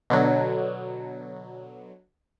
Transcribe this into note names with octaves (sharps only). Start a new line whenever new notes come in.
B2 D3 F#3